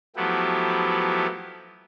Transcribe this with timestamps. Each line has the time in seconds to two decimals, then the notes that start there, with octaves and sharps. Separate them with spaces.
0.16 F3 F#3 A3 B3 E4 G4